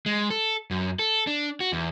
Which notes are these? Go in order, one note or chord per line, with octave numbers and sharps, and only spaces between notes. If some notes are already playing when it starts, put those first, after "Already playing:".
G#3
A4
F#2
A4
D4
F#4
E2